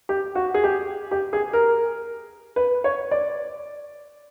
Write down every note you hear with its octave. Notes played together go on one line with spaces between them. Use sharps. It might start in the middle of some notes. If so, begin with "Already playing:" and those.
G4
F#4
G#4
G4
G4
G#4
A#4
B4
C#5
D5